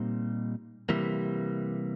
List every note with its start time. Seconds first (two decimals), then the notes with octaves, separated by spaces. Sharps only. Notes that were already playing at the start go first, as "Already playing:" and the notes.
Already playing: A#2 G3 C4 D#4
0.89 C3 E3 G3 A#3